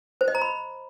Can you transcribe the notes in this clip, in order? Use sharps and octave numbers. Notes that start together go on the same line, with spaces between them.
C5
D#5
A#5
B5